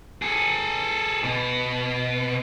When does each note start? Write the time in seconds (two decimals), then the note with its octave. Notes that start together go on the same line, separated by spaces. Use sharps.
0.22 G#4 A4
1.23 B2